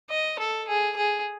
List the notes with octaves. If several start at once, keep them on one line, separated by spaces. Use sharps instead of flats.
D#5
A4
G#4
G#4